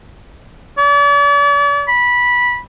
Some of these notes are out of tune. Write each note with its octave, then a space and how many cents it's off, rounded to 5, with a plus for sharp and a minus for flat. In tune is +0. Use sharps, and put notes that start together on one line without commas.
D5 -40
B5 -15